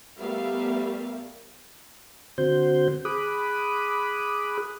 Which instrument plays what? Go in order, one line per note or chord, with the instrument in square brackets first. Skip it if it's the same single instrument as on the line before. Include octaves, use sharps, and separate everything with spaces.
[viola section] G3 A3 B3 A#4 E5 F5
[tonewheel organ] D3 C4 F#4 C5 G6
G#4 B5 D6 D#6 F#6